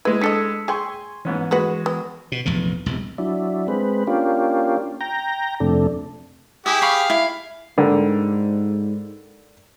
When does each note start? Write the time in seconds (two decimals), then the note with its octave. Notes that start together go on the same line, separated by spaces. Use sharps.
0.05 G#3 E4 B4 G#6
0.21 D4 A4 D#5 E6 B6 C#7
0.68 G#4 G5 G#5 C6 C#6
1.25 G#2 E3 B3 C#4
1.51 G#3 F#4 G#4 B4 F#5
1.86 B3
2.32 B2
2.45 F1 A#1 E2 E3
2.86 E1 C2
3.18 F#3 D4 E4
3.68 G#3 C4 B4
4.07 A#3 C#4 D4 F4 G4
5.01 G5 A#5
5.60 F2 C3 A3 D4
6.66 E4 G4 G#4 D#6
6.82 F5 B5 C#6
7.10 E4
7.78 G#2 D3 G3 A#3